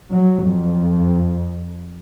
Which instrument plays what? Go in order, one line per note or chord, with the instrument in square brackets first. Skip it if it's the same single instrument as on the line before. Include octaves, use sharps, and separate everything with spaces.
[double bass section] F#3
F2